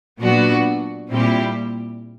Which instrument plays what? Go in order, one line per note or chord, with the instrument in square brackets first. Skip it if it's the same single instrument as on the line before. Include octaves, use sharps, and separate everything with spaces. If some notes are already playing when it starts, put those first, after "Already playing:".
[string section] A#2 F#3 B3 D4 F#4
A#2 G3 C4 E4 G4